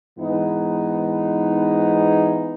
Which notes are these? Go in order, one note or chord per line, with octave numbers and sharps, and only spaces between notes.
G#2 E3 B3 D#4